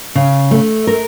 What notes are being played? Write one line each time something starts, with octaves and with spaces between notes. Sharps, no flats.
C#3
A3
A#4